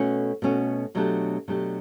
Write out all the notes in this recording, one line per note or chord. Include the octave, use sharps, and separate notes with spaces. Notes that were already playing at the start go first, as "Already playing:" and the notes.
Already playing: B2 A3 C#4 F#4
B2 A3 C#4 F#4
B2 F#3 A3 D4 G4
B2 F#3 A3 D4 G4